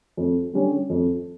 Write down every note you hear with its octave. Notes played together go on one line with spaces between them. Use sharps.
F2
D3 G3 C#4
F2